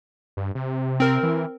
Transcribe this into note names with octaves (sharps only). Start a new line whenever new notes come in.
G2
C3
C4 A#4
E3